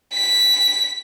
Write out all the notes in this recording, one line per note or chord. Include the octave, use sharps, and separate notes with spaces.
B6